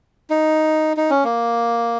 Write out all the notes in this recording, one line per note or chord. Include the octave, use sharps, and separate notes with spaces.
D#4
D#4
C#4
A#3